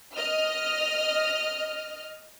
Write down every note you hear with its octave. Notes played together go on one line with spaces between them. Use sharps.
D#5 F6